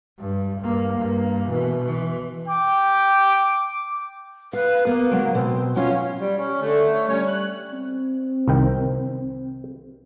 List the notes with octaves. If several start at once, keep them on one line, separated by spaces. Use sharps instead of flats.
G2
G2 A#3
G2 A#3
B2 E3
E3
G5 D6
B4 F5
A#3 B3
C#3 F#3 G#3
B2 C4
F#3 C#4 F4 F5
G3
C#4
D3 A3
C#5
G3 C#4 C#5
F#6
C4
C2 D#3 G5